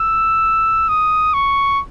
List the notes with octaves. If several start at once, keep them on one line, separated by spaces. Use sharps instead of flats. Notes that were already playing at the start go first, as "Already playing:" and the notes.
Already playing: E6
D#6
C#6